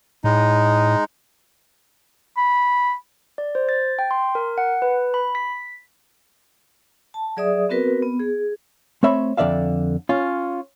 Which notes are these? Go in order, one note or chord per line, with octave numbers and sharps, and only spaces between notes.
A2 G#3 D#4
B5
D5
C5
A6
G5
C6
A#4
F#5
B4
B5
B6
A5
F#3 G#4 D5 E5 D#6
B3 C4 F#4 A#4 B4
B3
G#4
A3 C4 C#5 E5 B5
F2 D3 D5 E5 F5
C#4 F4